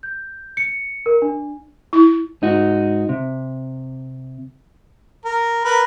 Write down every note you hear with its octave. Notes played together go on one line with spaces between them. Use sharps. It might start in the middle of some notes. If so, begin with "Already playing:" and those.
G6
C#7
A#4
D4
E4
G#2 D#4 F#4
C3
A#4
A#4 B4